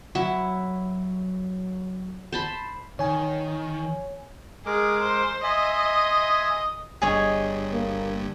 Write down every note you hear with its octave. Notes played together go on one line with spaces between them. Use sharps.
F#3 E4 E5 F#5
C5 A5 B5
D#3 C#5 G#5
G#3 G#4 A#4 D6
C5
D#5 E5 G#5 C6
G1 G2 G#4 C#5 D#5
A#3